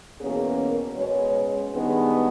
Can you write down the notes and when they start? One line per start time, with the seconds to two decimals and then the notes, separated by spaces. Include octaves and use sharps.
0.20 E2 B2 A#3 C#4 G#4
0.58 A#4
0.96 B2 G#3 C#4 C#5
1.73 G2 D#3 G#3 B3